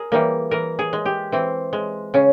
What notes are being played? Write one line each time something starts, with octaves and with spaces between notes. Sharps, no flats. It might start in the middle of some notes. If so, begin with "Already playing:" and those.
Already playing: G#4 A#4
E3 G3 A#3
E3 A#4
G#4
G#3
G4
E3 C4
G#3
C#3 C#4